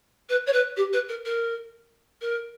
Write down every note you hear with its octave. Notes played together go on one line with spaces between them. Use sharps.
B4
C#5
B4
G4
B4
A#4
A#4
A#4